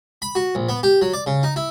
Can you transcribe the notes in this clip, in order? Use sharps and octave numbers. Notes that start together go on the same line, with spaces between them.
B5
F#4
A#1
B3
G4
F#3
D5
C#3
D#4
E4